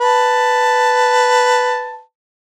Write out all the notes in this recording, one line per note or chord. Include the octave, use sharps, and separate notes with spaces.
B4 A5